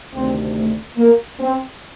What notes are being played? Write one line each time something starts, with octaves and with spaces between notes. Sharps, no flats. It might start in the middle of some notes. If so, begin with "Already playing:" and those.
D2 C3 D#3 C4
A3
A#3
C4